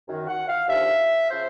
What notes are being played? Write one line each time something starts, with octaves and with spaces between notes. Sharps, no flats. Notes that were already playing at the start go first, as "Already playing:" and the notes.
F#2 D#3
F#5
F5
D#2 D3 F3 E5
C#3 F3 C5